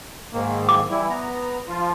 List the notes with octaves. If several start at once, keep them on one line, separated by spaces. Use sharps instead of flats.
G#2 D#3 A#3
D6
E3 G3 E4
B3 A#5
F3 F4